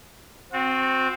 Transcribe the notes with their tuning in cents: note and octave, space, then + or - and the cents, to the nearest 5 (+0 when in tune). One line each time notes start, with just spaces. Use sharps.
C4 +0 F#4 -35